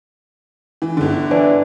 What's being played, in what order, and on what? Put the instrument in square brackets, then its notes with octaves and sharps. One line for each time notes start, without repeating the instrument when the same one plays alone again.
[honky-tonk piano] E3
G1 D3
[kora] E3 D4